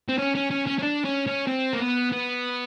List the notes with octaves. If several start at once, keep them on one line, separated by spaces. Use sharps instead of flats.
C4
C#4
C#4
C#4
C#4
C#4
D4
C#4
C#4
C4
A#3
B3
B3